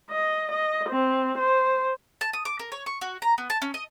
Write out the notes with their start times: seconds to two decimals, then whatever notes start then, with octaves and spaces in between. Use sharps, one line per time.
0.10 D#5
0.51 D#5
0.89 C4
1.38 C5
2.21 A5
2.33 D#6
2.45 D6
2.59 A#4
2.72 C#5
2.86 C#6
3.01 F#4
3.22 A#5
3.38 B3
3.50 A5
3.62 C#4
3.74 D#5